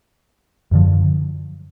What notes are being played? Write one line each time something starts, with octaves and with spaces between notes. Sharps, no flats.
F#2 D3 F3